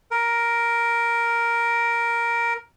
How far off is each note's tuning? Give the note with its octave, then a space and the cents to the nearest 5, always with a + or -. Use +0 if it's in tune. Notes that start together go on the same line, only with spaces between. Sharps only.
A#4 +5